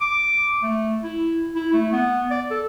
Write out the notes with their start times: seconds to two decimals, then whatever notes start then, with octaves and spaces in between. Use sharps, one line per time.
0.01 D6
0.62 A3
1.04 E4
1.55 E4
1.74 A3
1.93 B3
2.31 D5
2.51 A4